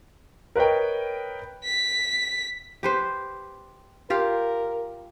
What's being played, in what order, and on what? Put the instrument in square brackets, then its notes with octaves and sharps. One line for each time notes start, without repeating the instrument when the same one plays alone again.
[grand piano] A#4 B4 C#5 D#5 G5
[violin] B6
[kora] G4 B4 C5
[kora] F4 G4 F5 [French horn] A#4